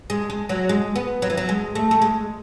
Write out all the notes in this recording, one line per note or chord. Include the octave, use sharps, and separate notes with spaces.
G#3
G#3
F#3
G#3
B3
F#3
E3
F#3
G#3
A3
A3
G#3